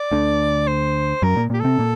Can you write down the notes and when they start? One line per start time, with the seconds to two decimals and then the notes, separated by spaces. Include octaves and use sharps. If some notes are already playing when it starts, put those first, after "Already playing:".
Already playing: D5
0.11 D2 D3
0.67 C5
1.22 F#2 F#3 A#4
1.36 A#2 A#3
1.50 A#2 A#3 G4
1.60 C3 C4 A4
1.79 A#2 A#3